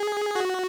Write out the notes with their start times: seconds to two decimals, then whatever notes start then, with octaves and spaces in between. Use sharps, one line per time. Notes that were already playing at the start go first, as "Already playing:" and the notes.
Already playing: G#4
0.35 F#4